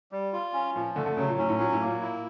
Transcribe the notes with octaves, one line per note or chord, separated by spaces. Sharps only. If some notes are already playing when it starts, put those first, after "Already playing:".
G3
F4
C#4
A#2 F3
D3 A3
D3
C#3 F#3
A#2
A2 C#4
A2
A#2 F#3
A2
A#3
A#2
E4